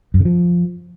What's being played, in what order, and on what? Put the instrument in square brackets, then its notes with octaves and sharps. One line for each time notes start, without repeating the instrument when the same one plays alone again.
[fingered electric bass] F#2
C#3
F3